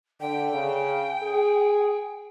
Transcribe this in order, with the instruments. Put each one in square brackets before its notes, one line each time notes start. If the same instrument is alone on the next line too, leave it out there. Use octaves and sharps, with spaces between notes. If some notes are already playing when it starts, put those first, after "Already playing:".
[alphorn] D3 [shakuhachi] G5
[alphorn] C#3
G#4